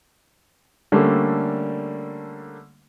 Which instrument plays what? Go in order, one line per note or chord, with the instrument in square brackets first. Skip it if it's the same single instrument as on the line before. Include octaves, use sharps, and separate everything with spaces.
[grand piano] D3 G3 A3 A#3 C#4